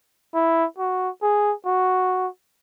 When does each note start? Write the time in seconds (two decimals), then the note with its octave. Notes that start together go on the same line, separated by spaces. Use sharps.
0.34 E4
0.78 F#4
1.22 G#4
1.66 F#4